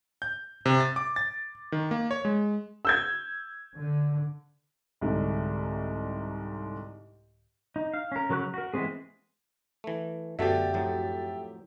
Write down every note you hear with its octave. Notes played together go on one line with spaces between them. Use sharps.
G6
C3
A6
D6
A6
D#3
A#3
C#5
G#3
E6 G6 G#6
D3
C2 G#2 D3
D#4
F5
C#4 A#4
C#3 F#3 A#4 C#6 F#6
F#4 A#4
E3 G#3 B3 C4 G#4
E3 A3
F#2 B2 D3 A3 F#4 G4 E5 A6
F2 A2 F#3